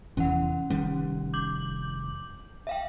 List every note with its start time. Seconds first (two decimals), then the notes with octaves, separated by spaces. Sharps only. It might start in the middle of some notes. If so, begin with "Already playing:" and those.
0.17 F1 E2 E3 C#4 F#5
0.70 F1 D#3 G3 C#4
1.34 D6 G6 F#7
2.67 E5 F5 G5